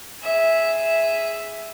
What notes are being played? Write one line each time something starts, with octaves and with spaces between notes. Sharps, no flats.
G#4 E5